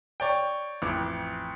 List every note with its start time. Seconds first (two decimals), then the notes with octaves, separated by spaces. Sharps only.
0.20 C#5 D5 G5
0.82 A1 F2 D6